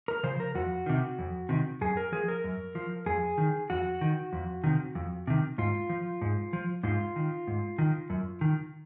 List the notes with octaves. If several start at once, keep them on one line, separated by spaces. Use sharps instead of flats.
A#4
C#3 F3 C5
A#4
F2 F#4
C3 D#3
F2
C3 D#3
F#2 G#4
A#4
F3 G#4
A#4
F#2
F3
F2 G#4
D#3
F2 F#4
D#3
F2
C3 D#3
F2
C3 D#3
G#2 F4
F3
G#2
F3
G#2 F4
D#3
G#2
D#3
F#2
D#3